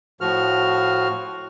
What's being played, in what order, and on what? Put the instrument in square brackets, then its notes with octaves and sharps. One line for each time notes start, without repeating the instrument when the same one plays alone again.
[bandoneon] A2 F3 F#4 F6